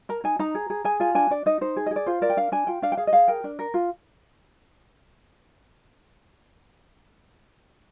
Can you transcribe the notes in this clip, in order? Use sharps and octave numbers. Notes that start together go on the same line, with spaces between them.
A#4 A#5
D#4 G#5
D#4 A#5
G#4
G#4
G#4 G#5
F4 G#5
D4 G#5
D4 D5
D#4 D#5
D#4 C5
G#4
D#5
G#4
D5
F4 C5
A#4 D5
G5
D4 F5
D4 G#5
F4 G5
D4 F5
G5
G#4 F5
D#5
G#4 F5
A#4 G5
D4
A#4
F4